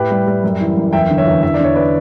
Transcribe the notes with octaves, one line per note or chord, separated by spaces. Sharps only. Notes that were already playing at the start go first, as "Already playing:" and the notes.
Already playing: A2 G4 B4
G3
G3
F#2
E3
F#2
E2 E5 G5
D3
C#5 E5
E2
E2 E5
D5
D3 C#5
B4 D5